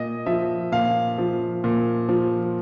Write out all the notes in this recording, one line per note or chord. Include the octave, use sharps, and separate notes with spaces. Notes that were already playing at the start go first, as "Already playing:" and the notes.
Already playing: A#2 D#5
F3 E5
A#2 F5
F3
A#2
F3